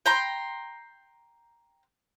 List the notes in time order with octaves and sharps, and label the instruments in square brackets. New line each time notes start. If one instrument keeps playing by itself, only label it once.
[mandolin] G5 A#5 C6